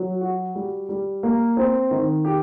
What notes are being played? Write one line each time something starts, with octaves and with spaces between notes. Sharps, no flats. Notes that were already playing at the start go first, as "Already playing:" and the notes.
Already playing: F#3
F#4
G3
G3
A#3
C4
D#3
G4